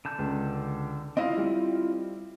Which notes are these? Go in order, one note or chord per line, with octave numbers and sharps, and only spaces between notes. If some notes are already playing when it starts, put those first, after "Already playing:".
D3 A5 G6
C#2
C4 E4 F4 D#5 F5
G3